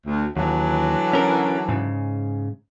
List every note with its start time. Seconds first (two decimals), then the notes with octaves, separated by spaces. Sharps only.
0.07 D2
0.37 D#2 D3 E3 F#3
1.13 C#4 A#4
1.69 G#2 C#3